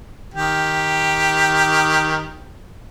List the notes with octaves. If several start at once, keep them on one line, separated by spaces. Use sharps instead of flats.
D#3 G4